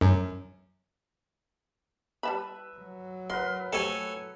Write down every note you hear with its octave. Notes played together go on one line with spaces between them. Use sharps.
F#2
G3 B4 E5 A5 B5
F#3
A#4 B4 F#5 C6
A3 G4 A4 C5 C#5 G#5